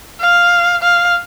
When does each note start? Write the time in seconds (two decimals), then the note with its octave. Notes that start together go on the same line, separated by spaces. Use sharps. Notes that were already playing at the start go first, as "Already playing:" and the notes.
0.20 F5
0.82 F5